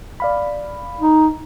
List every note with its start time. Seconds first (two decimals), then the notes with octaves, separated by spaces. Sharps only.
0.20 D5 F5 B5
1.00 D#4